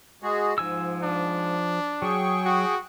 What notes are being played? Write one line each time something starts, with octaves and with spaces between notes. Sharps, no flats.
G#3 F#4 G#4
G#2 F3 G#5 E6
D4
F#3 G#4 G5 C#6
F#4